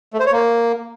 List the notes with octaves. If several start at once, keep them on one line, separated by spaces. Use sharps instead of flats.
A3
C5
C#5
A#3